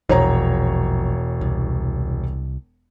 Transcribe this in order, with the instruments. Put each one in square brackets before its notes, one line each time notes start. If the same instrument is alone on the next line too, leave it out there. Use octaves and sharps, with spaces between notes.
[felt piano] E1 C#5 A#5 [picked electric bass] A#1
[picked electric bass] C2